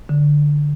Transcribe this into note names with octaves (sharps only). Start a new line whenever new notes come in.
D3